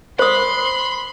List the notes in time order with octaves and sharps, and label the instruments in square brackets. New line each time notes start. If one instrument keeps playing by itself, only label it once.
[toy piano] C5 D#6 [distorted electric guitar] B5 [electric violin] C6